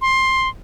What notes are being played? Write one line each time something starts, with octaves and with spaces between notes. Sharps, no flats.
C6